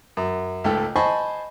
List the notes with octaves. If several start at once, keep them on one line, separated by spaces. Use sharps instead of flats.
F#2
C#2 G#2 A3 G5
C5 D#5 G#5 A5 B5 C#6